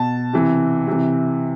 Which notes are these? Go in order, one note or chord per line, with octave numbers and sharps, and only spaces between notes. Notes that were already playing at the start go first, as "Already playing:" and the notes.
Already playing: B2 A5
C3 E3
C3 E3